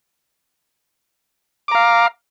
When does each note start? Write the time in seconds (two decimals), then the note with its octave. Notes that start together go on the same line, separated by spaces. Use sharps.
1.68 D6
1.72 A#5
1.75 F5